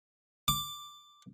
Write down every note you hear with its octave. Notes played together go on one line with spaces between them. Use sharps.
D6